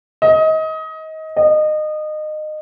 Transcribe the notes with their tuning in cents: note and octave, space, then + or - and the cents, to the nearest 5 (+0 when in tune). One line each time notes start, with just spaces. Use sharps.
D#5 +25
D#5 -25